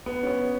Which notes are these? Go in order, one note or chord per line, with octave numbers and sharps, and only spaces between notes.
B3
C#4
B3